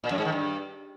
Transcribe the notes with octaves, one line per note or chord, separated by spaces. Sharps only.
A#2
F#2
G#2
D#3
G2